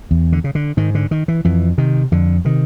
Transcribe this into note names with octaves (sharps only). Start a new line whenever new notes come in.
E2
D3
C#3
D3
G#2 D#3
D3
D#3
E3
F2 E3
C3 D#3
F2 D3
C3 D#3